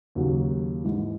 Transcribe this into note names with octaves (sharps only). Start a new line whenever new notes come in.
D#2 C#3 F#3
G#2 E3